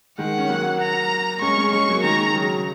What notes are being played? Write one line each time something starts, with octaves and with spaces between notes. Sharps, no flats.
D#3 G#3 F#5
C#4
F#3 A#3
A#5
G#3 C#4 C#6
G#3 C#4
G#3 C#4 C#6
F#3 A#3
D#3 G#3 A#5
C#3 F#3